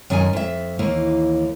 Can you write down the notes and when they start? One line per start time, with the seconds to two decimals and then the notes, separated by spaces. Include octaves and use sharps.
0.10 F#2 D#3 A#4 D#5 G#5
0.33 F2 E5
0.79 D#2 E3 A#3